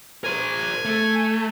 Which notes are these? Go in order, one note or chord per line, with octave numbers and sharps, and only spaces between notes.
A#4 C5 G#5
A3